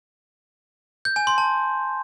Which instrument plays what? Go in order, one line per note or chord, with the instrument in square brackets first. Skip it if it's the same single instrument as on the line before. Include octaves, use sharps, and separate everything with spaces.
[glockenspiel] G6
G#5
C6
A5